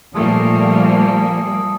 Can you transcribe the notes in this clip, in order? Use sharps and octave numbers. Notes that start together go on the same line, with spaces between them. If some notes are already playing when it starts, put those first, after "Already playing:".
A#2 F3 G3 A3 A#3 G#4 A4